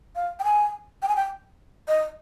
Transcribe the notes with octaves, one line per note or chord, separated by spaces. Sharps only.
F5
G5
G#5
G5
G#5
G5
D#5